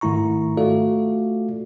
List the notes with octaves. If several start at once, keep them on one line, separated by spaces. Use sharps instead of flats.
G#2 D#3 A3 E4 A#5 C#6
A3 F4 F#4 A4 D5 F5